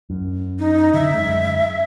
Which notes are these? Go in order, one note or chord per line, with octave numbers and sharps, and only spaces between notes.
F#2
D#4
D3 E5
F#2 G#3